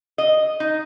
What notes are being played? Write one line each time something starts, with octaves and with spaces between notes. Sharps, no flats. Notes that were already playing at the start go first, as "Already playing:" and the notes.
D#5
D#4